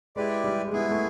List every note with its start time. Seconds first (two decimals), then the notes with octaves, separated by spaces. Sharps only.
0.16 G#3 E4 G4 B4 D5
0.44 G3
0.67 G#3
0.73 G3 B3 E4 G#4
0.91 A3